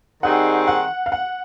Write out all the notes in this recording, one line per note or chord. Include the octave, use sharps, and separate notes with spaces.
D#3 G3 C4 D#4 G#4 F#5
F#5
F5
F#5